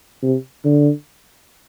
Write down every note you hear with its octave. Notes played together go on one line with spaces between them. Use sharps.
C3
D3